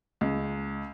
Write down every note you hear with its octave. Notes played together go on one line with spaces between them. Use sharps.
C#2